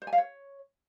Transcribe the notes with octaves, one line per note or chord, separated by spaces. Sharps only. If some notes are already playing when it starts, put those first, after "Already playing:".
C5
G#5
F5
C#5